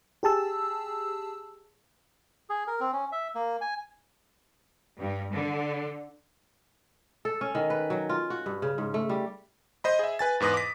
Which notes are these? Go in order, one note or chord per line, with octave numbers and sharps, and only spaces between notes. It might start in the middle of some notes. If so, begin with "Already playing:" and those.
G4 G#4 A5 E6
G#4
A#4
C4
C#4
E5
A#3
G#5
G2
D3
A4
C#4
D#3
B4
F#3
F4
F#4
G2
C#3
G#2
A3
G3
C5 D#5 B5
G#4 E5
B4 G#5 A6
E2 G#2 B4 D#6 A#6
D6 B6